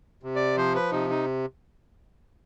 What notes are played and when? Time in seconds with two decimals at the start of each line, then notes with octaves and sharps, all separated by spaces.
0.23 C3
0.36 D5
0.57 F3 C5
0.75 B4
0.92 C3 D#4
1.10 D#4